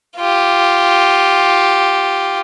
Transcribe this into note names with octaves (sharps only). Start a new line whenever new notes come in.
F4 G4